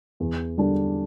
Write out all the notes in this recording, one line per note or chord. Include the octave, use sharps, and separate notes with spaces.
E2
D3 G3 D4